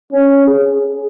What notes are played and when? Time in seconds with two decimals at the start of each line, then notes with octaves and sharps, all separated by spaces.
0.12 C#4
0.47 G#4